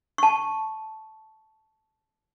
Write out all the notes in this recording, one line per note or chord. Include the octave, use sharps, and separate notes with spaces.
A5 C#6